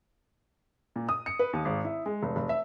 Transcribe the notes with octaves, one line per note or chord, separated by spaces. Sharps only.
A#2
D#6
C#7
B4
D#2
G#1
E4
G#3
F1
F1
E5